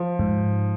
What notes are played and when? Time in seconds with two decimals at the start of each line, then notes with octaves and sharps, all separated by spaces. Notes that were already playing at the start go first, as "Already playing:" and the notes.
Already playing: F3
0.19 G#2